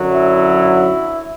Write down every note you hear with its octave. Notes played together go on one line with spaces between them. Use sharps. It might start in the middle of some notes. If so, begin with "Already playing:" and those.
Already playing: F#2 D3 F#3
E4